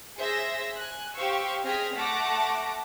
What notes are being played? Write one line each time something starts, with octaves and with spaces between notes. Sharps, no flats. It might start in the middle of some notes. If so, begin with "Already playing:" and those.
G#4 C5 E5 E6 A#6
G#5 F#6
G4 C5 F5 C#6 E6
C4 G#4 D#5 F6 B6
A3 F#5 A5 D6 A#6